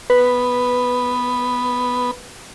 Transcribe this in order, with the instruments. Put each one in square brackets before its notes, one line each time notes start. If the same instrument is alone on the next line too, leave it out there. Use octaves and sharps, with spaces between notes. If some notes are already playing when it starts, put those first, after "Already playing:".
[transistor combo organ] B3 [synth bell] B4